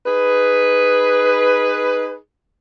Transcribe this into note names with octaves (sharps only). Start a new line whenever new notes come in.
D#4 G#4 B4